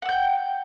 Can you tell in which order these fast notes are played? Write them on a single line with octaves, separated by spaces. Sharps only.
F#5 E6 G6 G5